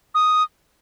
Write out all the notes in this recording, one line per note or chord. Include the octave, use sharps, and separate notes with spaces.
D#6